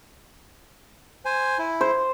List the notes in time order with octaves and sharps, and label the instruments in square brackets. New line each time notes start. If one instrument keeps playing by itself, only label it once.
[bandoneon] C5 G#5
E4
[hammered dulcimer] C5